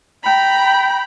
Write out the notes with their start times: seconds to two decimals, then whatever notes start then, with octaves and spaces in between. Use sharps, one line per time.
0.23 G5 A#5 B5